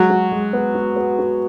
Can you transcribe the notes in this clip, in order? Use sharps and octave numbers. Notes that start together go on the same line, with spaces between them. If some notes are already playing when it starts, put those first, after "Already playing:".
Already playing: F#3 G#3
F#4
G#3
B3
F#4
B3
F#4